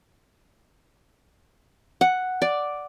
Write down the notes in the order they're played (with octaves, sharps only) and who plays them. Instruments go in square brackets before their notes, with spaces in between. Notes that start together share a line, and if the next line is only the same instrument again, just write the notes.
[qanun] F#5
D5